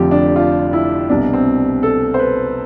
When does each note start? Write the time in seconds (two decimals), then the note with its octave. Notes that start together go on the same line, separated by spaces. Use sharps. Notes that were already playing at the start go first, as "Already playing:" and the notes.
Already playing: F1 F2 D3 F3 G4
0.11 D4
0.36 F4
0.73 E4
1.09 C2 B2 D4
1.34 C4
1.83 A4
2.14 C5
2.19 B4